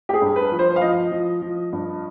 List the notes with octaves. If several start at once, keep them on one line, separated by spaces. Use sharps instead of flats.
G4
G#4
G2
B4
F3
C5
F5
F3 D#5
F3
F3
G2